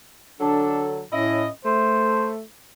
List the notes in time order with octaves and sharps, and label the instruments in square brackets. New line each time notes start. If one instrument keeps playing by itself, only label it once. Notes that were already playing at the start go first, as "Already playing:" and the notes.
[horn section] D3 F#3 A4 [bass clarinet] D4
[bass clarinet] A2 [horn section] C#4 E4 D#5
[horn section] A3 [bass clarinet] C5